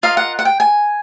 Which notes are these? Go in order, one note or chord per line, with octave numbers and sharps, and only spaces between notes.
F4 A#4 D#5 F5
F#5
F#5
G5
G#5